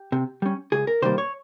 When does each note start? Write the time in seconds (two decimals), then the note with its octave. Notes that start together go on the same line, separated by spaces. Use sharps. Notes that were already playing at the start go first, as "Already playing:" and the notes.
Already playing: G4
0.12 C3
0.42 G3 C#4
0.72 C#2 G#4
0.87 A#4
1.02 C3 D#3 G3 A#3 C5
1.18 C#5